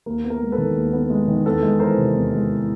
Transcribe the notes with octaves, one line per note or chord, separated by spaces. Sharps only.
D#2 A#4
B3
A#4
G#3
A4 B4
D#3
D#2
B3
G#3
D#3
E2 A4 B4
G#3
E3 A#4 C5
C3
E2
G#3
E3